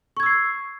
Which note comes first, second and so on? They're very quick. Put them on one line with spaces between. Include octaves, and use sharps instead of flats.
C#6 G#6 E6 C7